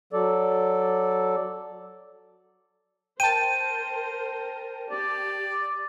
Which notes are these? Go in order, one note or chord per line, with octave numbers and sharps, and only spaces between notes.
F#3 A4 D5
A#4 C5 G5 A5 D#7
G4 D5